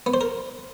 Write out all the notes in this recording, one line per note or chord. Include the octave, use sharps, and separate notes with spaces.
B3
C5
A#4